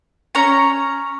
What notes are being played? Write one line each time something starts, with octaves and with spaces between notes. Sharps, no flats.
C#4 C#5 A#5